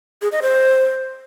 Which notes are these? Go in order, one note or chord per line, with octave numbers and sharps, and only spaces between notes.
G#4
D#5
C5